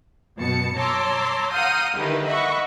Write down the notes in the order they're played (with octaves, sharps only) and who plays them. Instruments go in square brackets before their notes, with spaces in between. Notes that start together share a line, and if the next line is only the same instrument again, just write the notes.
[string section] F#2 B2 A5 C#7
C#5 A5 A#5 C6 D6 E6
F5 F#5 A#5 D#6 F6 G6
D3 D#3 D#4 E4 G4 B4
D#5 E5 F#5 B5 C#6